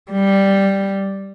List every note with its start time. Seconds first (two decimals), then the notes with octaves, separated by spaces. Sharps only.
0.12 G3